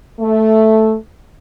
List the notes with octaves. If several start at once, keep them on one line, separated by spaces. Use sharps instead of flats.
A3